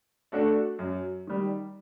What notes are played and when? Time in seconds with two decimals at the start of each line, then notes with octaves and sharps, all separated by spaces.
0.32 A3 D4 F#4 A4
0.79 F#2
1.27 D#3 G3